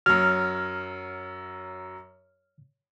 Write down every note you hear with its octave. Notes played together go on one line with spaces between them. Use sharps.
F#2 F#3 F6